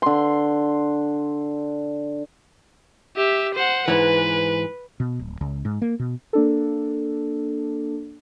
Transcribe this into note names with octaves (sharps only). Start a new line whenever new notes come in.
D3 C6
G4 E5
C5 F#5
G#2 E3 B4
B2
D1
C#2
G#2
A#3
B2
A#3 D4 A4